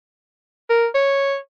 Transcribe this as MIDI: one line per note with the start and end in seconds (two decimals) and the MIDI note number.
0.70 0.87 70
0.95 1.37 73